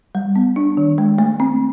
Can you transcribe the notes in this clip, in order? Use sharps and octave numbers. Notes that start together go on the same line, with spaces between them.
G3
B3
D4
D#3
G#3
A3
C4